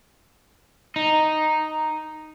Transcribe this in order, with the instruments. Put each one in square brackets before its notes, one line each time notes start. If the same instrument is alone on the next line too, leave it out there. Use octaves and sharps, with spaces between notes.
[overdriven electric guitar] D#4